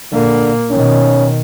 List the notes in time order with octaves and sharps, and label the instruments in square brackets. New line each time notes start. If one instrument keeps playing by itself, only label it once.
[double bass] A#2 A#3 [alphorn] D3
[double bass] B2 D#3 [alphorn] C#4